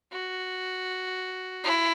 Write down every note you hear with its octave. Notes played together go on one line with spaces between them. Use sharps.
F#4
E4